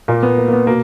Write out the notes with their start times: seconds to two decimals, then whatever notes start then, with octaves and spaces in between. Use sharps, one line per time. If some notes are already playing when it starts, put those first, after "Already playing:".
0.08 A#2 A#3
0.23 B3
0.38 A#3
0.48 A#3
0.53 B3
0.67 B2 A#3